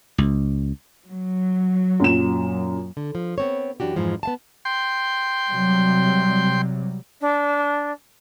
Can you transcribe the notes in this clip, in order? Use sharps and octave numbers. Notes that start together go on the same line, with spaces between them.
C#2
F#3
F#2 A#2 E7
D3
F3
B3 C4 C#5
F#2 E3 D4 F#4 G4
F2 G#2 E3 F3 G#3
B3 F5 A5
G5 C6
C3 F#3 G3
D4